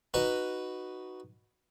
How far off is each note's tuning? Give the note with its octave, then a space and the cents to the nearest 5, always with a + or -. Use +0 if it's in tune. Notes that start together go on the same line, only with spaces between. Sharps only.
D#4 -10 F#4 +0 B4 +0